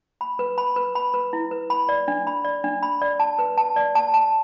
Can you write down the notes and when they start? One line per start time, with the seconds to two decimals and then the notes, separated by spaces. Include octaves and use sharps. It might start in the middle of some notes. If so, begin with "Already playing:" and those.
0.21 B5
0.39 B4
0.58 B5
0.76 B4
0.95 B5
1.14 B4
1.33 E4
1.51 B4
1.70 B5
1.89 D5
2.08 D4
2.27 B5
2.45 D5
2.64 D4
2.83 B5
3.01 D5
3.20 A5
3.39 B4
3.58 A5
3.76 D5
3.95 A5
4.14 A5